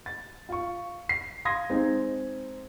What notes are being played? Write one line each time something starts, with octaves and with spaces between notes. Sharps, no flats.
A6
F4 C#6
C7
F5 C6 D#6 G#6 A#6
G#3 C4 D#4